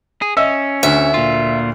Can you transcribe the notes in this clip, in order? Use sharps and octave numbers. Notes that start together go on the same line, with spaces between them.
G#4
C#4 D#5 E5 E6
D2 E5
A#2 F4